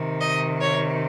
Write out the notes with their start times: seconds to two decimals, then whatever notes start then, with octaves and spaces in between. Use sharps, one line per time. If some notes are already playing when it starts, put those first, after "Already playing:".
Already playing: C3 D#3
0.20 D#5
0.60 C#5